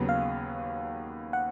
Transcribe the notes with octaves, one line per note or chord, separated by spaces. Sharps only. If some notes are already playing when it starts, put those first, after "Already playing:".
Already playing: D#2 C#3 F#3 B3
F5
F#5